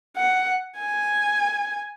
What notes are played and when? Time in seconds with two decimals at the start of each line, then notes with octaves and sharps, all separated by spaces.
0.17 F#5
0.79 G#5